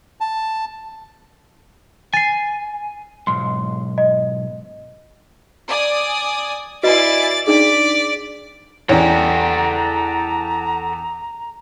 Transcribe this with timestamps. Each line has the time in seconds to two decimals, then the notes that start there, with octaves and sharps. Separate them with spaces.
0.21 A5
2.14 G#5 A6 C7
3.27 B1 G#2 C6
3.98 D#5
5.66 D5 G#5 D#6
6.83 E4 F#4 B4 D5 D#5 G#5 A6 C7
7.47 D4 D#4 G#4 D5 D6 B6
8.89 E2 C#4 D4 A4 C#5 F#5 G5 A#5